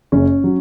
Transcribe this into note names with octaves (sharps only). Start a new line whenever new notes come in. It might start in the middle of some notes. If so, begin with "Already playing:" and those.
F#1 C#4
F#3